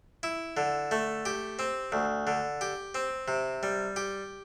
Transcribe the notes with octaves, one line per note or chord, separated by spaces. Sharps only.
E4
D3
A3
G4
C4
D2
D3
G4
C4
C3
G3
G4